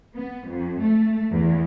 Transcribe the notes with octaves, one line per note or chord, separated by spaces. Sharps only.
B3
F2
A3
E2